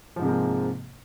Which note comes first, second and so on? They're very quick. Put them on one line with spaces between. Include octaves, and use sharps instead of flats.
F3 G#2 C3 G#3 A#3